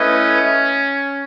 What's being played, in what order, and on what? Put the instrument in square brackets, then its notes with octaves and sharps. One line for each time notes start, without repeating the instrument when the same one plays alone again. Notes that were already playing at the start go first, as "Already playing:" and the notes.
Already playing: [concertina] A3 E4 B4 D#5 [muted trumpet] C#4